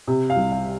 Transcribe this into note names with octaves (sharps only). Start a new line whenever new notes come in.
C3
F5
C2
F5